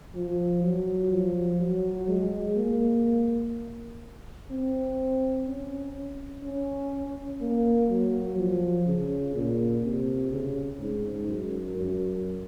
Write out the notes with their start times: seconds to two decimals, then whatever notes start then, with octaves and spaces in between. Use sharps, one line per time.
0.15 F3
0.63 F#3
1.12 F3
1.60 F#3
2.09 G#3
2.57 A#3
4.51 C4
5.48 C#4
6.44 C#4
7.41 A#3
7.90 F#3
8.38 F3
8.87 C#3
9.35 A#2
9.84 C3
10.32 C#3
10.81 G#2
11.28 F#2
11.77 F#2